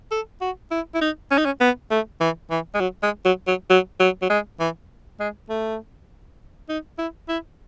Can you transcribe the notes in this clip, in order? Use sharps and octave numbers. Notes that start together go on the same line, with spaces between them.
A4
F#4
E4
E4
D#4
C#4
D#4
C#4
B3
A3
E3
E3
G#3
F#3
G#3
F#3
F#3
F#3
F#3
F#3
G#3
E3
G#3
A3
D#4
E4
E4